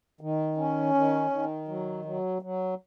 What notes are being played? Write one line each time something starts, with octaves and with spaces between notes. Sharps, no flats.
D#3
C#4
D#3
D#3
F#3
F#3
F#3